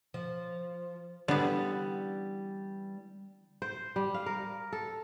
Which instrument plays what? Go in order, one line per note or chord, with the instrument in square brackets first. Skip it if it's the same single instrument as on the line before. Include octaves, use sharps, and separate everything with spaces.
[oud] F3
[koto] D3 B3 [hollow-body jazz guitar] E3 G3 C#4
[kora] C5
G3
F5
A#4
A4